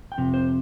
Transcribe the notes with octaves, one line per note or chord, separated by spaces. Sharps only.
G5
F2 C3
C5